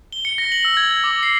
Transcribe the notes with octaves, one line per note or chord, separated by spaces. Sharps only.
G7
C#7
A#6
F#7
E6
G#6
G#6
D6
C7